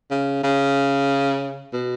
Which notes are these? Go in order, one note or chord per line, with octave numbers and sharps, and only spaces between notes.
C#3
C#3
B2